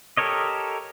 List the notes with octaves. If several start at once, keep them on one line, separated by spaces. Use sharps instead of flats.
G4 A4 A#4 C#5 D#5